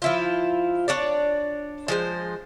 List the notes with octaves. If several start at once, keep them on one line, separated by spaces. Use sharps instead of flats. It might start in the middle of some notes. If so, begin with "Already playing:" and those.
F3 E4 F4
D4 C#5 D5
F3 G#3 C5